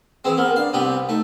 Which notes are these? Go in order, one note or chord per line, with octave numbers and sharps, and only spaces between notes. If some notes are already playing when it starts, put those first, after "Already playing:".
E3 C4 G#4
B3 A#4
D4 F5
C2 B3 C4 G4
A3 D#4